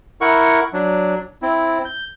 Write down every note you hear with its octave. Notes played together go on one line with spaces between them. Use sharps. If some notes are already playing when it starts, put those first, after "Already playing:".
E4 A#4 F#5 C#6
F#3 D4
C4 E4
G6